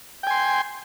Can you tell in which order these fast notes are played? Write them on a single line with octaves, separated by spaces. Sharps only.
G5 G#5 C6